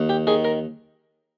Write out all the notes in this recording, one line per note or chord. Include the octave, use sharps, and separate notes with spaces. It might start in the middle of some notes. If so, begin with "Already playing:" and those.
Already playing: D#2
G4
D#3 G#4
A#4